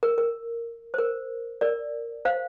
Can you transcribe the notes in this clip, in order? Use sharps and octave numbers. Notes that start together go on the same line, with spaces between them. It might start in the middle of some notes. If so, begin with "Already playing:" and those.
A#4
A#4
C5
A#4
A#4 D5
C5 F5